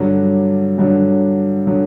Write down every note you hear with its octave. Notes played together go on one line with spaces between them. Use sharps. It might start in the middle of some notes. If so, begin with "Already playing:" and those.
Already playing: G2 D3 F#3
G2 D3 F#3
D3 F#3